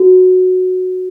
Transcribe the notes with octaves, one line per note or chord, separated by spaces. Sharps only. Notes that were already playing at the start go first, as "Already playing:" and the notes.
Already playing: F#4